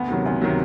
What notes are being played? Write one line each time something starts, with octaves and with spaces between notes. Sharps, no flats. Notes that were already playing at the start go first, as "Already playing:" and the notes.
Already playing: D2 B3
C3 D#3 F#3
D2
C3 D#3 F#3